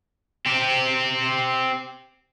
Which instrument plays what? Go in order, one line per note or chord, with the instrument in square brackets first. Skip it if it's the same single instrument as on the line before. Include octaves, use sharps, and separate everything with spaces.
[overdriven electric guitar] C4 G4